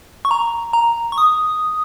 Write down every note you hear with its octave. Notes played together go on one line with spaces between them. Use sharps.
C#6
A#5
A#5
C#6
D#6